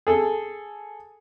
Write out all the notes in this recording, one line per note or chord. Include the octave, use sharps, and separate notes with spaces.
G#4 A4